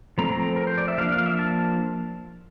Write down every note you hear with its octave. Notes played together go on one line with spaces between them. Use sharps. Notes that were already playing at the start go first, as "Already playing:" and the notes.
F3 A3 C4 A#5
A#5
A#4
C5
D5
E5
F3 A#3 D4 F5
F5
E5
A5